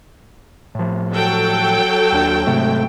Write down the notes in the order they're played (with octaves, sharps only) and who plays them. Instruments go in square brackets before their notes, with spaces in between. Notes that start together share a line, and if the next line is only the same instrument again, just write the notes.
[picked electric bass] A2 F3
[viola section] F#3 A4 G5
[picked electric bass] D#2 D4
G#2 C3 A3